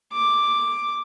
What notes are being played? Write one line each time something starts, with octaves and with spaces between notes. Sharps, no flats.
D6